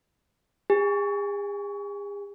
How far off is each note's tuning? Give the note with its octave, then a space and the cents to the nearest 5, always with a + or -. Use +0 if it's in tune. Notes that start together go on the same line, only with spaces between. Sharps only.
G#4 -45 G#5 +0